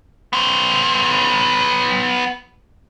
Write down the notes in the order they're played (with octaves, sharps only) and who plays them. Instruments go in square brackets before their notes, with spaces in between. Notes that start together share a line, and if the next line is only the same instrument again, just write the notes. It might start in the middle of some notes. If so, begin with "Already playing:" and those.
[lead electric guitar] B3 C5